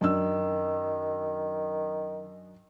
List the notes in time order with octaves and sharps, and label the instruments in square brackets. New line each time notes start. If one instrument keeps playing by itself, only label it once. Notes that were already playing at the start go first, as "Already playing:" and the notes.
[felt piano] F#2 D4 E6 [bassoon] D#3